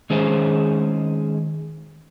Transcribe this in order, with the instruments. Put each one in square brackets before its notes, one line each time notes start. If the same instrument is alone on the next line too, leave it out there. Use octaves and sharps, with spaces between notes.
[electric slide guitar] D#3 G#3 C#4 G#4 C5